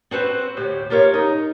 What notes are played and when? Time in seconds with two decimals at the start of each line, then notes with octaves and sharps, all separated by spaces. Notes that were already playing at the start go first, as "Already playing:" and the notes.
0.11 C4 F#4 B4 C5
0.57 D2 A2 G4 C5
0.90 F4 G4 A#4 C#5 F5
1.14 D#4